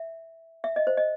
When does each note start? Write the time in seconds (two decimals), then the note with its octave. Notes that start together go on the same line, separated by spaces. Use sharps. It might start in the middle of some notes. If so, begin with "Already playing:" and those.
Already playing: E5
0.64 E5
0.76 D#5
0.87 C5
0.97 D#5